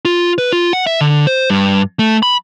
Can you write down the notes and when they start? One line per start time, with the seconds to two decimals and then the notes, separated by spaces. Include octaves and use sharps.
0.05 F4
0.38 B4
0.53 F4
0.73 F#5
0.87 E5
1.01 D3
1.27 C5
1.50 G2
1.99 A3
2.23 B5